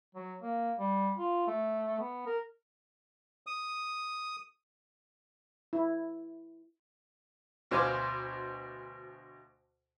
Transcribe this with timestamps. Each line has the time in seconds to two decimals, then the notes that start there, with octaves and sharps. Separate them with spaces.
0.15 F#3
0.42 A#3
0.79 G3
1.18 F4
1.47 A3
1.99 B3
2.26 A#4
3.47 D#6
5.73 E4
7.71 D2 B2 C5 F5 G#5 D6